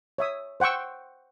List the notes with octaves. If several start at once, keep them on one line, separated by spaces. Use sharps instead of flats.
C#5 E5 D#6
C5 F#5 G5 C#6 E6